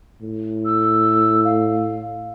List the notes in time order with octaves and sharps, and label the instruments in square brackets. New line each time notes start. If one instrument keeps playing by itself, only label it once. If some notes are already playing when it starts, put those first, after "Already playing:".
[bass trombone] A2
[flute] E6
F5